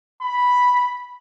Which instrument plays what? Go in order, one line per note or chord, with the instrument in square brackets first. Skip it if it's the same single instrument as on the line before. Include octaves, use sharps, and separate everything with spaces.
[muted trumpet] B5